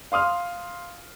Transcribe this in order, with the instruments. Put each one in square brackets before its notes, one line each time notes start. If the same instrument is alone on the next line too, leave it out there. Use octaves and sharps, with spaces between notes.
[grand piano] F5 C6 D#6 F6